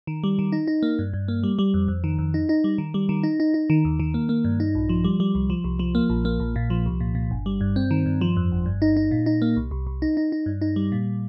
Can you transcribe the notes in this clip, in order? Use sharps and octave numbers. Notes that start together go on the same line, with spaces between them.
D#3
G3
D#3
D#4
D#4
A#3
G2
G2
A#3
G3
G3
F2
F2
D#3
F2
D#4
D#4
G3
D#3
G3
D#3
D#4
D#4
D#4
D#3
D#2
D#3
A#3
A#3
G2
D#4
A#1
F3
G3
G3
C2
F3
C2
F3
A#3
A#1
A#3
A#1
A#2
F3
C2
A#2
A#2
G1
G3
G2
C4
D#3
G2
F3
F2
G1
G2
D#4
D#4
A#2
D#4
A#3
C2
C2
C2
D#4
D#4
D#4
G2
D#4
G3
A#2